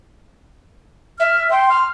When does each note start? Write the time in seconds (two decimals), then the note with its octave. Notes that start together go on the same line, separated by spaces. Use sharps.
1.19 E5 F6
1.51 G5 C6
1.70 F6